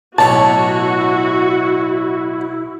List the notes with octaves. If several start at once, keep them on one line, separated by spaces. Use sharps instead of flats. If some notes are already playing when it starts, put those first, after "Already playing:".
B1 A2 E4 F#4 C#5 A5